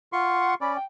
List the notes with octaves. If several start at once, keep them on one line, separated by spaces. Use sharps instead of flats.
F4 F#5 C6 C#6
C#4 D5 B5
G5